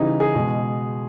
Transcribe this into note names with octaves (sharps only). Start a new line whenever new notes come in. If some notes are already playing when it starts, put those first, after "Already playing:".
Already playing: C#3 E3 G3 D#4
G#4
B2 G#3